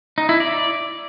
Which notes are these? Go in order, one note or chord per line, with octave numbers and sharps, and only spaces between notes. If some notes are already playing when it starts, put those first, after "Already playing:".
D#4
E4
D5